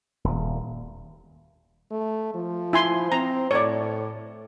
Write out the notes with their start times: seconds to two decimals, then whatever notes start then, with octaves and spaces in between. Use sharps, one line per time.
0.24 D#1
1.91 A3
2.35 F3
2.73 E4 G#5 C6
3.12 C4 A#5
3.51 A2 C#5 D5